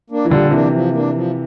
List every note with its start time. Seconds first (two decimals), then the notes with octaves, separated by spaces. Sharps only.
0.10 A#3 D4
0.25 E3
0.30 A#2 D3 G3
0.51 C3 E3 A#3 D4
0.72 F3
0.93 A#3 D4
1.15 F3